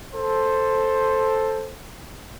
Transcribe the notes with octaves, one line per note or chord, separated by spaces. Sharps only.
A4 C5